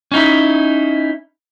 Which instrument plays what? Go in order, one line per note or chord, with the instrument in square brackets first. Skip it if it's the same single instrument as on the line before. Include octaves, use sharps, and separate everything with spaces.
[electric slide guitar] C#4 D#4 E4